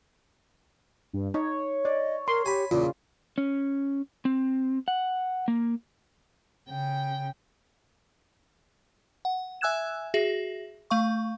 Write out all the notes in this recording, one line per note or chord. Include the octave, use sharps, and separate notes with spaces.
G2
D#4 C#5
D5 D#5
A#4 C6
G4 G#5 B5
E2 A#2 C#3 F4
C#4
C4
F#5
A#3
C#3 G5
F#5
E5 G#5 E6 F#6 G#6 E7
F#4 G#4 E5 A#6
A3 F5 C#6